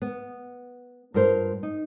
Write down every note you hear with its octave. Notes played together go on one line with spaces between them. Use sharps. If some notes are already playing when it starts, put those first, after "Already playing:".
B3
G2 F4 A#4 C5
D#4